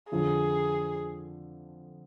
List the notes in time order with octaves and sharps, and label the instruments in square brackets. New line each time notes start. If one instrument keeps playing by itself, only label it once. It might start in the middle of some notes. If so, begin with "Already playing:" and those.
[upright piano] F2 D3 F3 [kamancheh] G#4